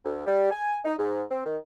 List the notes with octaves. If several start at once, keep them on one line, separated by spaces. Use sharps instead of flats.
D2
G3
G#5
D#4
G#2
C4
D#3